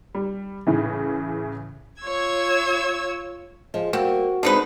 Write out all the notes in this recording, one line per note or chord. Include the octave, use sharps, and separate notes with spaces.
G3
A2 C#3 E3
F4 C#5 E6 G#6
F3 G#3
G3 A#3 C4 F#4
D3 G#3 C4 D#4 B4 D5